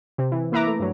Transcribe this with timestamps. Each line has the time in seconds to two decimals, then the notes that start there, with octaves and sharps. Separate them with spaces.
0.18 C3 C4
0.32 E3
0.52 A#3 E4 B4 E5 A#5 D6
0.67 A3
0.79 G2 F#3